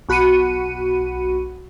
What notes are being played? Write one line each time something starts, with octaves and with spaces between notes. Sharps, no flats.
B1 F#4 B5 C#7 D#7